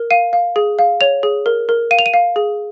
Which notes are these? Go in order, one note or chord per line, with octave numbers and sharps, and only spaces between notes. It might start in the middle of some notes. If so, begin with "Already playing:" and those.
Already playing: A#4
F5 D#7
F5
G#4
F5
C#5 F7
G#4
A#4
A#4
F5 D#7
F7
D#7
F5
G#4